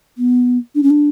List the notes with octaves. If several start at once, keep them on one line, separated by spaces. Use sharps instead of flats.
B3
D4
C#4
D4